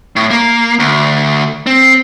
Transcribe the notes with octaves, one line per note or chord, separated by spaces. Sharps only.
A2
A#3
D2
C4